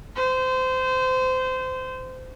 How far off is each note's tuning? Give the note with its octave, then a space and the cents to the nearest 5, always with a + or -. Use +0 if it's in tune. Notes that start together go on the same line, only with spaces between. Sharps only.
C5 -25